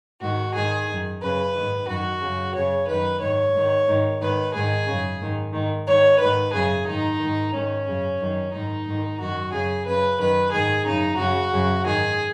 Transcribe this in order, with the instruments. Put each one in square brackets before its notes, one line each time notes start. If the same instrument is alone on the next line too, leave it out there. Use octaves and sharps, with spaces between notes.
[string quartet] G#2 D#3 F#4
G#2 D#3 G#4
F#2 D#3
F#2 C#3 B4
G#2 D#3
F#2 D#3 F#4
F#2 C#3
F#2 C#3 C#5
F#2 D#3 B4
G#2 D#3 C#5
G#2 D#3
G#2 D#3
G#2 D#3 B4
G#2 D#3 G#4
F#2 C#3
G#2 D#3
G#2 D#3
G#2 D#3 C#5
G#2 D#3 B4
F#2 C#3 G#4
G#2 D#3 D#4
G#2 D#3
G#2 D#3 C#4
F#2 C#3
F#2 D#3
G#2 D#3 D#4
G#2 D#3
F#2 D#3 F#4
F#2 C#3 G#4
F#2 C#3 B4
F#2 D#3 B4
G#2 D#3 G#4
F#2 C#3 D#4
F#2 C#3 F#4
F#2 C#3
G#2 D#3 G#4